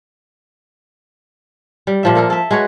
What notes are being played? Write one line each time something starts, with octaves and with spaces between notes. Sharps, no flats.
G3
A#2 F3 E5
A#3 A4 A#4
A4 E5
G#3 F#4 B4 C#5